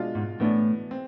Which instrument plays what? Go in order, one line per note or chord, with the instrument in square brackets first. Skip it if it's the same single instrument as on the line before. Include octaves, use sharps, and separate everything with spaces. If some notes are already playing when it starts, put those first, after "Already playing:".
Already playing: [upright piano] B2 G#3 D4 F4
[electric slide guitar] G#2
[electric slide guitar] A2 [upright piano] E3 B3 D4
[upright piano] C4